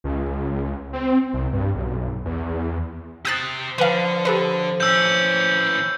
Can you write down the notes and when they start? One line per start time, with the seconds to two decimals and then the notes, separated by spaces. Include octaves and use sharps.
0.04 C#2
0.93 C4
1.33 C2
1.53 G2
1.75 B1
2.25 E2
3.25 G4 C5 D#6 F#6 A6
3.78 D3 F3 B4 F5
4.25 G4 A4 B4
4.80 E3 C#4 E6 G6